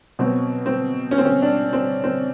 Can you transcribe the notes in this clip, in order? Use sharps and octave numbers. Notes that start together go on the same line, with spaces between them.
B2 F#3 C4
C4
C#4
C4
C#4
D4
C4
C4